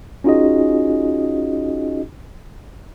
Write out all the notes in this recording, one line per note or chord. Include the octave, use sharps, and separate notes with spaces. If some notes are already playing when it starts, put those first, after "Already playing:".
C#4 D#4 F4 F#4 G#4 D#5